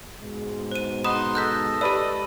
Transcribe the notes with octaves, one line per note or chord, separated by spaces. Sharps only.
G#2 B2 G#3
C5 D#7
D#4 F#5 B5 C6 D#6 E7
A4 D#5 F#6 G6 B6
G4 B4 D5 B5 E6